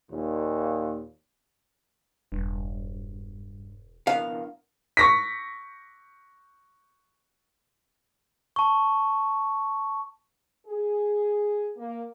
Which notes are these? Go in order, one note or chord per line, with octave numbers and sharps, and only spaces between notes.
D#2 A#2
E1 G2
B3 D4 E4 A#4 F5
C#6 A#6 B6
A5 C#6
G#4
A#3